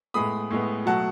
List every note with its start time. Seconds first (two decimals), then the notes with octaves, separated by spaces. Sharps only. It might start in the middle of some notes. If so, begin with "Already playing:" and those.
0.14 A2 G#3 B3 B5 D#6
0.50 A2 G#3 B3
0.86 B2 F#3 A3 F#5 A5